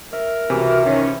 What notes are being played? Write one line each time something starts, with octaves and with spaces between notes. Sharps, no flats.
A#4 E5
C#2 C3 E3 F#4
D#3 C#4